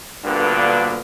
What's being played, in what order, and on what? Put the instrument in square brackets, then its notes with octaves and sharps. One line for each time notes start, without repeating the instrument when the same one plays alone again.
[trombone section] D2 G2 A#2 D3 A#3 B3